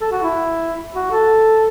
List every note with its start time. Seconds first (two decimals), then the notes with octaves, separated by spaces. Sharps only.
0.01 A4
0.11 F#4
0.23 E4
0.95 F#4
1.11 A4